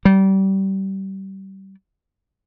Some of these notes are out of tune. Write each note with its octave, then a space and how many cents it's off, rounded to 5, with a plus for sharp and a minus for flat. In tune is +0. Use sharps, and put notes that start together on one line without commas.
G3 -25